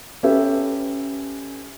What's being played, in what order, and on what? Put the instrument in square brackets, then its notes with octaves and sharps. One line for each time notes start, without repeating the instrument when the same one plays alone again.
[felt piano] C#4 G4 A4 B4 E5